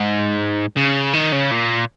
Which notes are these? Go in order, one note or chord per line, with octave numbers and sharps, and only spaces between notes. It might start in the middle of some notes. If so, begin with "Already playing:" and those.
Already playing: G#2
C#3
D#3
C#3
A#2